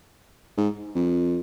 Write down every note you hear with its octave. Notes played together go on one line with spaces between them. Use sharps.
G#2
F2